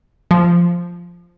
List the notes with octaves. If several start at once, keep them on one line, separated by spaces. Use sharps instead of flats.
F3